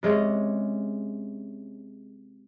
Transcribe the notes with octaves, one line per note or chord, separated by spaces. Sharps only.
C3 G#3 C#4